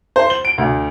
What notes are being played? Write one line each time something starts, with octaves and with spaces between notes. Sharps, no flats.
C5
G7
D7
D2